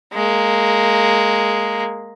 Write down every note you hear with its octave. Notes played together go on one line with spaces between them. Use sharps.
G#3 A#3